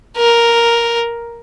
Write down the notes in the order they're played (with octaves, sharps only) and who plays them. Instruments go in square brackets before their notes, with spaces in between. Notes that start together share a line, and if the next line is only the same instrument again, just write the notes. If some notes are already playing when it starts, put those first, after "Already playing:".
[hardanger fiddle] A#4